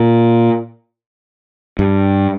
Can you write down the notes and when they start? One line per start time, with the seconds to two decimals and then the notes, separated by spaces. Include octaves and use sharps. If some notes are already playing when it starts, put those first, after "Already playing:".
Already playing: A#2
1.79 G2